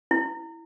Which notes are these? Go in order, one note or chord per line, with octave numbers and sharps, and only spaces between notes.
E4